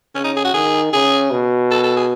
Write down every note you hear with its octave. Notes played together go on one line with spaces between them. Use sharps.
C#3 C#4
D#4
G#4
F#4
D#3 G#4
C#3 G#4
B2
A4
A4
G#4